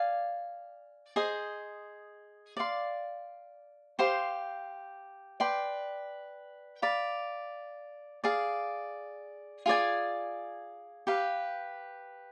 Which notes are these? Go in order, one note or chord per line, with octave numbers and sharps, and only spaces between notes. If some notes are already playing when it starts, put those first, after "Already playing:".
Already playing: D5 F5 G#5
G#4 C5 D#5
D5 F5 C6
G4 C5 F5 C6
B4 D5 G5 C6
D5 F5 B5
G#4 D5 F5
F4 G#4 D5 G#5
G4 B4 F5